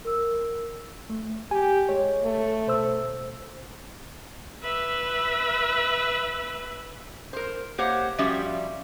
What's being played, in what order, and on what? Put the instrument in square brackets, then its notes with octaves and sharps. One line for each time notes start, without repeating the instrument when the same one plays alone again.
[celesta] A#4 E6
[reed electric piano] A3
[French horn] G4 [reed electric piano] G#5
[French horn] G#3 [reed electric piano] C#5
[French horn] A3
[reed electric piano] B2 C5 E6
[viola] B4 E5
[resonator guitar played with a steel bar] A#4 C5
A#3 G4 C5 C#5 F#5
F3 G3 C#4 F#4 G4 E5